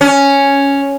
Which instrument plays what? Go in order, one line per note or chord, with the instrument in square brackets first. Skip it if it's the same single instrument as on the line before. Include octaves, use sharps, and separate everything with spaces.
[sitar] C#4